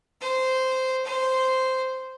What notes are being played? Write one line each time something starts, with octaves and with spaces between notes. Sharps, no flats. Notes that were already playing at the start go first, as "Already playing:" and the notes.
C5
C5